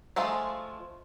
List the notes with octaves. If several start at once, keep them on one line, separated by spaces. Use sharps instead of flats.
F3 G#3 A3 F4